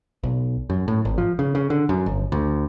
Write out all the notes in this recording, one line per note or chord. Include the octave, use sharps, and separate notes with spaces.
B1
F#2
A2
G#1
F3
C#3
C#3
D3
F#2
G1
D2